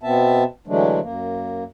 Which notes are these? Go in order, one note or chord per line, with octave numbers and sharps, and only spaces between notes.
B2 B3 C4 E5 A5
D3 E3 F#3 G#3 A3 D4
F#2 A#3